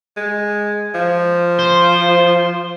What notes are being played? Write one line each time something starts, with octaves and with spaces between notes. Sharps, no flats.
G#3
F3
C5